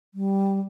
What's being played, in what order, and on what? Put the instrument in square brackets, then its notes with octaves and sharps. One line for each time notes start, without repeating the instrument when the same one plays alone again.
[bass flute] G3